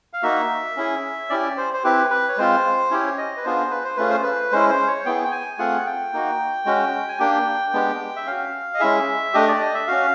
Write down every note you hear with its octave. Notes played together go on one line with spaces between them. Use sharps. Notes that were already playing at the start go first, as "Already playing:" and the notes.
F5
A#3 D#4 F#4 E5
C#4 E4 G#4
C#4 E4 G4 D5
C5
C5
C4 E4 G4 B4
B4
C#5
G#3 C4 F4 C5
C#4 E4 G4 C#5
D#5
B4
B3 D4 F4 G#4 C5
B4
C5
A3 C#4 F4 G#4 B4
C5
B4
G#3 C#4 E4 C5
C5
C#5
B3 E4 G#4 G5
G5
G#5
A3 C4 F4 G#4 F#5
G5
A#3 D#4 F#4
G#3 C#4 F#4
G#5
A#3 D4 G4 G5
G#3 B3 D4 G4
E5
C#4 F#4 F5
D#5
G#3 C#4 E4 G#4 E5
A3 D4 G4 D#5
D5
D#5
E5
C#4 F#4 F5